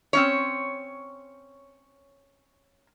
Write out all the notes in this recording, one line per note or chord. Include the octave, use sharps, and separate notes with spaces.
C4 C#4 C#5